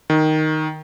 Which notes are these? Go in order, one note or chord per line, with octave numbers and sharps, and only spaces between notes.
D#3